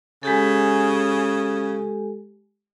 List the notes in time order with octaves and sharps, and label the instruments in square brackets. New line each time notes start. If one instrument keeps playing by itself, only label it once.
[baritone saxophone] C#3 [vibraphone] G#3 G4 A4